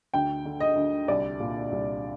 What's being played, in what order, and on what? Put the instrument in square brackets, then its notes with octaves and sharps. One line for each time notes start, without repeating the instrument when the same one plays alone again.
[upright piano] D2 G5
D3
D#5
D2
C2 D5
A#2
C2